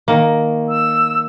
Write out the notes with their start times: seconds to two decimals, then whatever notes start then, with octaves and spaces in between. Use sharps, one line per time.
0.08 D#3 A#3
0.69 E6